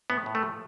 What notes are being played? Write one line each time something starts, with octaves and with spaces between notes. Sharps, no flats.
A2 B3
A2
A3
F3